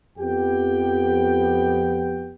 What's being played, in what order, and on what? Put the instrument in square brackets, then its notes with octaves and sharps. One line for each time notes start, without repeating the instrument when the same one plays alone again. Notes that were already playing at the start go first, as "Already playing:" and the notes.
[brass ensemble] F2 B3 G4 G5